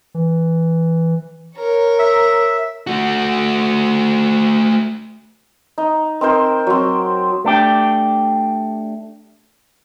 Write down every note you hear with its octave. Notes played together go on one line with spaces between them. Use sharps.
E3
A#4 C#5
E5
A3 F#4
D#4
C4 D#4 A#4 C5
F#3 C4
A3 D4 G4